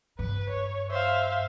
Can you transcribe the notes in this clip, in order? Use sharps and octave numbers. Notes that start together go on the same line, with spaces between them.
G2 B4
C#5
C5 E5 F5